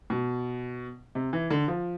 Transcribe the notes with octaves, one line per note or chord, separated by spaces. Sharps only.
B2
C3
E3
D3
F3